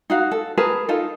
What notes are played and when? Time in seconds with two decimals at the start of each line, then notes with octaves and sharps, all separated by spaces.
0.10 D#4 F#4 F5
0.32 A4
0.58 G#4 A#4 B4 A5
0.89 D#4 F4 A4